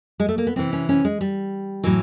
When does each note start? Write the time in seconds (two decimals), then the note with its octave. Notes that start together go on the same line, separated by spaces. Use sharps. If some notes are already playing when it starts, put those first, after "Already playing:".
0.20 G#3
0.29 A3
0.38 A#3
0.47 B3
0.56 C3 E3 C4
0.73 C#4
0.89 C#4
1.05 G#3
1.21 G3
1.84 A2 E3 F#3